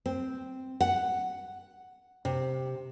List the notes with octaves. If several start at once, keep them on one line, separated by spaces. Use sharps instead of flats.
C4
F#5
C3